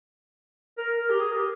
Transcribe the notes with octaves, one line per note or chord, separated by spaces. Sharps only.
A#4
A#4
G4
G#4
A#4
G4